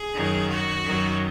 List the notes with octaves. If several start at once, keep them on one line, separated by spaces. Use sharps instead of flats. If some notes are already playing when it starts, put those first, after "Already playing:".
Already playing: G#4
F#2 D#3 F#3
F#4
F#2 D#3 F#3